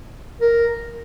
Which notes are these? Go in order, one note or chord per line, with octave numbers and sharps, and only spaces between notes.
A#4